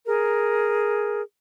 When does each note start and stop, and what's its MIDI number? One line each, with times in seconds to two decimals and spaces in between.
0.06 1.21 68
0.06 1.21 70